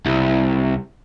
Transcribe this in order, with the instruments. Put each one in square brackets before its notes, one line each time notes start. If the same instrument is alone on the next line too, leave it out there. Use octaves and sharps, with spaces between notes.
[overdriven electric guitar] C2